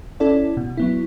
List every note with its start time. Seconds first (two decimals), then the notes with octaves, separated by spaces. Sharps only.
0.20 C#4 E4 A4 D5
0.57 B2
0.77 F#3 B3 E4